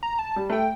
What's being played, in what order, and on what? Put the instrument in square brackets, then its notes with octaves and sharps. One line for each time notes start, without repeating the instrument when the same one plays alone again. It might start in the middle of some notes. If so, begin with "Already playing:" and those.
[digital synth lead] A#5
A5
[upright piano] G3
[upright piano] A3 [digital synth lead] G5